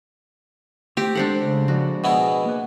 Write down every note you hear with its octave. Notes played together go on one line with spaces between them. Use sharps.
A3 C4 G4
G#3 D4 A4 C5 F#5
C#3
F3 G#3 F#4 D5
B2 B3 E4 G#4
A#3 B4